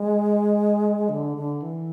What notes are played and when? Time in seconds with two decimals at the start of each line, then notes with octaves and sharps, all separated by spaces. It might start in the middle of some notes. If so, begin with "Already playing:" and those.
Already playing: G#3
1.09 D3
1.37 D3
1.62 E3